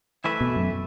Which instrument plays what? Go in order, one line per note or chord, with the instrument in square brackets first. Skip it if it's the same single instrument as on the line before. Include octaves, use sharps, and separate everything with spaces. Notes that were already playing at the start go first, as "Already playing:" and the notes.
[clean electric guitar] E3 A3 E4 B4 E5
[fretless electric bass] B2
F#2